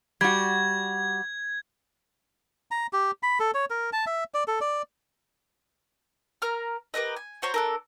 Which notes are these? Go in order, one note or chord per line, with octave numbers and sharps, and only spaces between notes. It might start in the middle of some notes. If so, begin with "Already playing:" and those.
G3 F#4 G#6
A#5
G4
B5
A4
C#5
A#4
A5
E5
D5
A4
D5
A#4 A#5 F6
G4 A#4 B4 D#5
G#5
F#4 C5 C#5 A#5
D4 A4 A#4